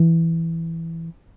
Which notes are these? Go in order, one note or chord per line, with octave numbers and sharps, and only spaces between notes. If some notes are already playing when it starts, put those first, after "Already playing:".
Already playing: E3